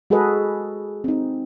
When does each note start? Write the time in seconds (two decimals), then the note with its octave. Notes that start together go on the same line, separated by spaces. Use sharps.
0.10 G#3 F#4 G#4 A4 B4 D#5
1.04 C4 D#4